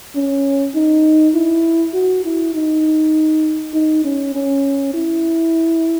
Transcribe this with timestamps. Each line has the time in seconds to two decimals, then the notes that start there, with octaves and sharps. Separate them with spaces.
0.15 C#4
0.75 D#4
1.35 E4
1.94 F#4
2.25 E4
2.55 D#4
3.74 D#4
4.04 C#4
4.35 C#4
4.94 E4